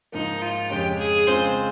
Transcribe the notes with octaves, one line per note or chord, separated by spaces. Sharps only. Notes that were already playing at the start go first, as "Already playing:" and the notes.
G#2 F3 A#3 D#4
F4
F2 C#3 G#3 C#4 G4
G#4
C#3 G#3 C4 F4 G#4 C5